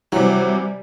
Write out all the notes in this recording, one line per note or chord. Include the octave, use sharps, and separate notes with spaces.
C3 E3 F#3 G3